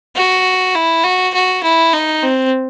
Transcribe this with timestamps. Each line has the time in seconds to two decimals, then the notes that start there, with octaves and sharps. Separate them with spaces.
0.16 F#4
0.75 E4
1.04 F#4
1.34 F#4
1.63 E4
1.93 D#4
2.23 C4